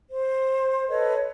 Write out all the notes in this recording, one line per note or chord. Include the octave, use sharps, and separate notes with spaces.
C5
A4 B4 C#5 D#5